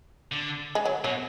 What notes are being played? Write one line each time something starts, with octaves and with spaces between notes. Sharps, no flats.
D3
G#3
F#3
B2 F#3